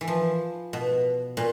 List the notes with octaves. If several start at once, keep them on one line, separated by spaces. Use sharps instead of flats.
E3
F3
B2
A#2